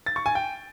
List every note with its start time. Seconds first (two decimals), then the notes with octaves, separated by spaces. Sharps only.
0.06 A6
0.16 C#6
0.26 G#5
0.35 G5